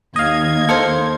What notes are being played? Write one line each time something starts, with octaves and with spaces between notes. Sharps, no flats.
D#2 D#5 F5 G#6
A4 A#4 C5